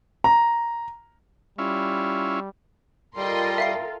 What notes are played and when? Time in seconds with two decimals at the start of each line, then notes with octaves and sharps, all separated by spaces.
0.24 A#5
1.58 G3 C#4 E4 F4
3.16 G3 F4 A4 A#4 D#5 G5 C6
3.58 E5 F5 C7